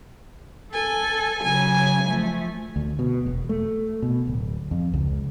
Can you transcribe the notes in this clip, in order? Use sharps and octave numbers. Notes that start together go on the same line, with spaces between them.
A4 G#5
C#3 F#3 G#5
F3 A3
D2
B2
E1
A3
B2
D1
F2
C#2